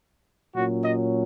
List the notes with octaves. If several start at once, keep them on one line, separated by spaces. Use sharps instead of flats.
A#2 F#3 C#4 F#4
D#5